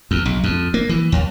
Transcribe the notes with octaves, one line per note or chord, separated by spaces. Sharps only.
E2
B1
F2
A#3
E3
D#2